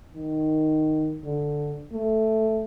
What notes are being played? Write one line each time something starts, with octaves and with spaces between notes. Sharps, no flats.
D#3
D3
A3